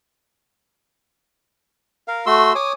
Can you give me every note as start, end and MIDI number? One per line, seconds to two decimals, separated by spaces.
2.08 2.25 70
2.08 2.25 77
2.26 2.53 57
2.26 2.53 66
2.26 2.53 84
2.26 2.53 88
2.55 2.73 73
2.55 2.73 80
2.55 2.73 86
2.55 2.73 87